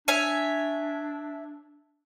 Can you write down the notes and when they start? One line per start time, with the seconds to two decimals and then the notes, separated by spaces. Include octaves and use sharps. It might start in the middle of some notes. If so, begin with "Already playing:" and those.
0.08 D4 C#5 E5 G#5